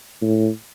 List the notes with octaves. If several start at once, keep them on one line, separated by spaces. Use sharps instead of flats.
A2